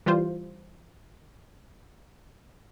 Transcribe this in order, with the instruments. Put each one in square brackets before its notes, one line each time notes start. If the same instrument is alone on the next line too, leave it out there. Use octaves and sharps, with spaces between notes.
[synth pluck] E3 G3 F4 C5